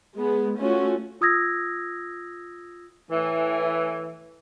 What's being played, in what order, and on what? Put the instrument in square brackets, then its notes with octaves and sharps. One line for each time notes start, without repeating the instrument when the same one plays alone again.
[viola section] G#3 B3
A3 C#4 F4 F#4
[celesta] F4 D#6 E6 G#6 A#6
[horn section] A2 E3